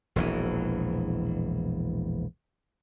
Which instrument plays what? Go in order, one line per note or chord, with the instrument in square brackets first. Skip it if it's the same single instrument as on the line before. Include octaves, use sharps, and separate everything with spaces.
[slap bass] E1 A#1 E3